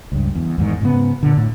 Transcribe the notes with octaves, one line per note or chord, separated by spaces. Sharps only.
C#2 G2
E2
E2 G#2 D#3
G#2 C#3 B3
A#2 D3
A2